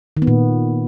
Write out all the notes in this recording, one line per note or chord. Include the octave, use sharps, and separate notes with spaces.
D#3
B3
A#2